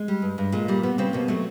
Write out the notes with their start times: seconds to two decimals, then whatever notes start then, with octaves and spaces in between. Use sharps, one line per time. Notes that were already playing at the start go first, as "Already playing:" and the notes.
Already playing: G#3
0.08 G3
0.22 G2
0.38 G2
0.52 A#2 G#3
0.68 G3 A#3
0.83 G3 B3
0.98 C#3 C4
1.13 B2 A#3
1.28 F#3 A3